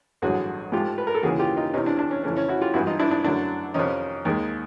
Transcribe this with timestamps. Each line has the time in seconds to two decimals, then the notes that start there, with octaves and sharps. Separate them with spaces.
0.22 A1 G2 D3 F#3 F#4 G#4
0.72 G#2 F3 A3 F4 G4
0.98 B4
1.07 A#4
1.15 A4
1.23 D#2 C#3 E3 F#4 G#4
1.39 F4 G4
1.57 D#4 F4
1.73 E2 C3 E3 C#4 D#4
1.86 D4
1.99 D4
2.11 C#4
2.23 F2 C#3 E3 A3 C#4
2.37 C#4
2.48 E4 F#4
2.61 F4 G4
2.74 G#1 G2 E3 E4 F#4
2.87 D#4 F4
2.99 D4 E4
3.11 D4
3.24 F#2 D3 F#3 A3 D4
3.74 F2 C3 D#3 C#4 D#4
4.25 D#2 D#3 G#3